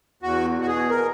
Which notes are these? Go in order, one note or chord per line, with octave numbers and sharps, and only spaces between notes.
E2 F#4
B2
F#4
G#4
A#4